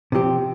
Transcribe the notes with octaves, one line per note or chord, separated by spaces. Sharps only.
C3 F3 C4 G4